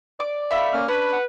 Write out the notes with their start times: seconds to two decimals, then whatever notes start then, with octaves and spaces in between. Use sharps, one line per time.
0.20 D5 D6
0.51 A3 E5 F5 B5
0.73 A#3 C#4 F6
0.88 C#4 D4 B4 B5
1.13 F#5